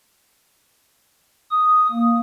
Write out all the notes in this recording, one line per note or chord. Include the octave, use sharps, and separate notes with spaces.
D#6
A#3